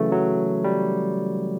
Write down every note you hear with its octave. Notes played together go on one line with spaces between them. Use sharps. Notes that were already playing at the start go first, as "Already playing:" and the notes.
Already playing: C#3 E3 F#3 A3
F#3
G3